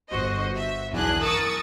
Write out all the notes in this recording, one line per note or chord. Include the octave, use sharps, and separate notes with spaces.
G1 F#4 C5 D#5
E5
B1 E2 D4 G#4 F#6
A#4 C#6 D#6 E6 A6